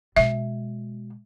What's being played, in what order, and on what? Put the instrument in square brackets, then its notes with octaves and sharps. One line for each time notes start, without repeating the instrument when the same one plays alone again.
[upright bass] B2 G#3 [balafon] E5